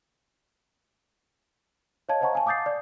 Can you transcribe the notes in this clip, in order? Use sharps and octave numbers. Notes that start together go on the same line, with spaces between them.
C#5 D#5 F5 A5 G#6
C5 D#5 F#5 A5 A#5 C#6
F5 G#5 A5
F5 D6 D#6 G6 A6 C7
D5